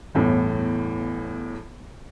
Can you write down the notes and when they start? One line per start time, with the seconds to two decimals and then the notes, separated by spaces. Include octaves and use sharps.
0.15 G1 E2 A2